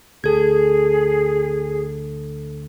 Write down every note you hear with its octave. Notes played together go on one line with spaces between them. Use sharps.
D2 G#4 A4 G#6